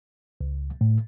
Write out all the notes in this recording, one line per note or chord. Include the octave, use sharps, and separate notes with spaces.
C#2
A2